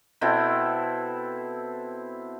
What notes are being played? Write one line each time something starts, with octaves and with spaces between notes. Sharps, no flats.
B2 C4 E4 A4